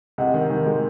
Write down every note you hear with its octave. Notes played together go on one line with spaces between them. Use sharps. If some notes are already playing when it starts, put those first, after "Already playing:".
C3 D#5 F#5
D#3
D#3
G#3